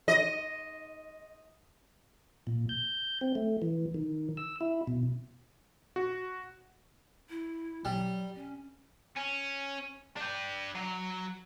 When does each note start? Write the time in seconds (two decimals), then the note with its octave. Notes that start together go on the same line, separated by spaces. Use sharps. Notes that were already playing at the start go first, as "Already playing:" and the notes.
0.08 D#5
2.47 A#2
2.69 G6
3.21 C4
3.35 A3
3.62 E3
3.94 D#3
4.37 E6
4.61 E4
4.87 B2
5.96 F#4
7.29 E4
7.85 F#3 G3
8.35 C#4
9.17 C#4
10.16 D4 G5
10.75 F#3